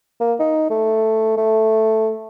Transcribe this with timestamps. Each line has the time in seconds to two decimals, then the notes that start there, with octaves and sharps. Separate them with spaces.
0.20 A#3
0.39 D#4
0.70 A3
1.37 A3